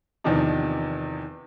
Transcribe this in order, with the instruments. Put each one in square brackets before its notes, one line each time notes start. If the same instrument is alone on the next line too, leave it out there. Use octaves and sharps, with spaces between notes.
[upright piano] E2 C3 D#3 F3 D4 D#4